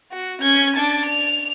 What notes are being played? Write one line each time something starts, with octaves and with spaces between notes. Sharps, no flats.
F#4
C#4 G#6
D4 A5
F7